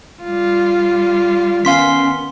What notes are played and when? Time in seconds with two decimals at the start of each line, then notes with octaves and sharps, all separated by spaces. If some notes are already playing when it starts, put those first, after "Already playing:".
0.23 G3 F4
1.65 D#3 B3 C#4 F5 C6 B6